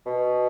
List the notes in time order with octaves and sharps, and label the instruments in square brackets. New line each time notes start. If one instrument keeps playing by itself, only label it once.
[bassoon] B2